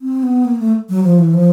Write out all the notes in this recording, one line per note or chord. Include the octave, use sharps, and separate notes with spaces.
C4
B3
A#3
A3
F#3
F3
E3
F3